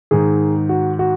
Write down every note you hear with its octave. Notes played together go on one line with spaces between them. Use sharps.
G#2 D#3 G#4
F#4
F#4